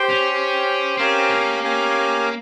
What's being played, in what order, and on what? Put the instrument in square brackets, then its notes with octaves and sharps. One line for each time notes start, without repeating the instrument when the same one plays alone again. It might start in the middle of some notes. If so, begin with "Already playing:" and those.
Already playing: [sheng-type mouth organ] G4 C5 G5
[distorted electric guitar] C#4
[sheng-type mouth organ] G4 C5 G5
[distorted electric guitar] C4 [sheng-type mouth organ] C#4 G4 A#4 F5 G#5
[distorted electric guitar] A#3
[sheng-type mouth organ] C#4 G4 A#4 F5 G#5